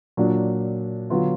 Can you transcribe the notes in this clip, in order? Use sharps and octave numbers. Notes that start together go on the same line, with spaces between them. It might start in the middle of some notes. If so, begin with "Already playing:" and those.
A#2 F#3 D4
D3 F#3 B3 F4